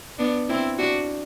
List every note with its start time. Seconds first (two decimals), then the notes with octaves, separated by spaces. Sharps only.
0.19 B3 D4
0.49 C4 E4
0.79 D4 F#4